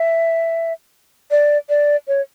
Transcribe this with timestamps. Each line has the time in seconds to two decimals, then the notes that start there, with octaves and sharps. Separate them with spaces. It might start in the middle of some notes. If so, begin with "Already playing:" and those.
Already playing: E5
1.31 D5
1.69 D5
2.08 C#5